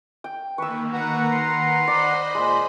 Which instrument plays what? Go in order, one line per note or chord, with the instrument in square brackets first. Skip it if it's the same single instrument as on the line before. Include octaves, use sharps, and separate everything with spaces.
[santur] G5
[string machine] D#3 A#3 [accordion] B4 [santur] C#6 E6
[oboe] F#4 [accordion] B4 F#5 A#5
[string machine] D#3 [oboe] C6
[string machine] C5 D#5 B5 [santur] D5
[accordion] A#2 [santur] G#3